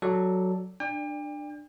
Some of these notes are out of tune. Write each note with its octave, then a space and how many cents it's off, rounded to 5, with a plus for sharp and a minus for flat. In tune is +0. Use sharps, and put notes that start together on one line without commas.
F#3 +0 A4 +0 D5 +0
D4 +20 D5 +0 G5 +40